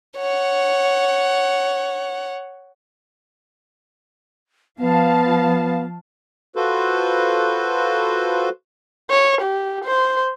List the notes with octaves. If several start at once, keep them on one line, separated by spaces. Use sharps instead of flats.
C#5 F#5
F3 B3 F5 A5
F4 F#4 A4 B4 C5
C#5
G4
C5